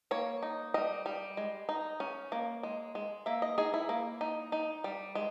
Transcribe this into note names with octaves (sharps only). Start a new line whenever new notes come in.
A#3 C#5
D#4
G3 D#5
G3
G#3
D#4
C#4
A#3
G#3
G#3
A#3 E5
D#5
D#4 G#4
E4
A#3
D#4
D#4
G3
G#3